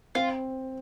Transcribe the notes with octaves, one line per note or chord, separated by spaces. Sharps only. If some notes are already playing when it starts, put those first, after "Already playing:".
C4 F4